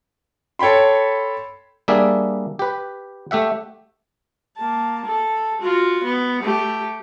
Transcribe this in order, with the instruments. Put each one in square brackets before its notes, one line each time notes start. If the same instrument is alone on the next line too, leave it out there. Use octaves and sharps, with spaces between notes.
[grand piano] A4 C#5 G5 B5 C6
[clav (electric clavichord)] G3 A#3 D4 G#4 E5
G4 B4
A3 G4 E5 F#5
[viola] A#3 A5
A4
F4 F#4
B3
A3 G4